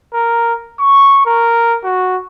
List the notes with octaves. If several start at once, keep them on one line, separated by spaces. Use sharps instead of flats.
A#4
C#6
A#4
F#4